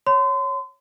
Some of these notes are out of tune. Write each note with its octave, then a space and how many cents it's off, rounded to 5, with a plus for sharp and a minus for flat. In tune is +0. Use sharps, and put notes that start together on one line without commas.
C#5 +0 C6 -35